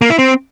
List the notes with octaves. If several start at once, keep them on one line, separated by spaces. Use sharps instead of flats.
A#3
E4
C4